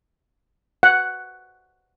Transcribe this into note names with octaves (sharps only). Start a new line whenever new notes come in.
F#5